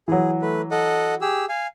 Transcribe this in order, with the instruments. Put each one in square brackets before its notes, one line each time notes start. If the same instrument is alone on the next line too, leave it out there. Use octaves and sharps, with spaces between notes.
[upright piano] E3 F#3 [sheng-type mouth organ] G#4
[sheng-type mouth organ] A3 B4
A4 D#5 F#5
G4 G#4 E6
F5 G#5